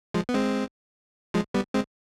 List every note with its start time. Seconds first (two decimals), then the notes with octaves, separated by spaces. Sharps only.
0.14 F3 G#3
0.29 B3
0.34 G#3 C4
1.34 F3 G#3
1.54 G3 B3
1.74 G#3 C4